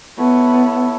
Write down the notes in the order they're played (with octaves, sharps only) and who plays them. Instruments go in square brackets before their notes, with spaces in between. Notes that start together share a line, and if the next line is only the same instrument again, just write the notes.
[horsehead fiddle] B3 [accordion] E4 A4 C#5